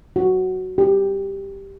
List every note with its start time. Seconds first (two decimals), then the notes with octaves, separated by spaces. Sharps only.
0.16 F#4
0.78 G4